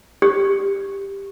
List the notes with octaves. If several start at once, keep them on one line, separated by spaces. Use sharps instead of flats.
G4